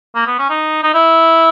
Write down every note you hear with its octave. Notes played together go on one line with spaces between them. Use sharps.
A#3
B3
C#4
D#4
D#4
E4